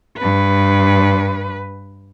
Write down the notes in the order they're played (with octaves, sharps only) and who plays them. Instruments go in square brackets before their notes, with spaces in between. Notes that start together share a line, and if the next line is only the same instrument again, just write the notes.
[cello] G2 B4